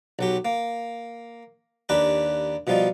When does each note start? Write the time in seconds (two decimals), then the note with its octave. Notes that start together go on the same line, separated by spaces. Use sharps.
0.19 B1 F#3 G4
0.45 A#3
1.89 D#2 D4 G4 B4 A#5
2.67 B2 F3 G3 D#4 F4